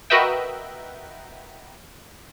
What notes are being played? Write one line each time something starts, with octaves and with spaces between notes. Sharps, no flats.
F#4 A#4 B4 D#5 E5 G5